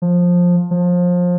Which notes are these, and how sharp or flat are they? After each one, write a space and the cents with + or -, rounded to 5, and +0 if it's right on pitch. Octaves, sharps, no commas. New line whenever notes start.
F3 +15
F3 +25